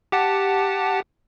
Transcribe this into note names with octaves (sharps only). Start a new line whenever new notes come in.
G4 F#5 A5